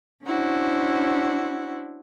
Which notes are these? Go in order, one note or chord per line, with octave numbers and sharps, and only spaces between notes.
C#4 D4 E4 F#4 C5